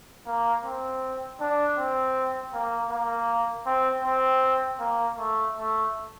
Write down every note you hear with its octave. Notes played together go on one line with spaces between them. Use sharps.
A#3
C4
D4
C4
A#3
A#3
C4
C4
A#3
A3
A3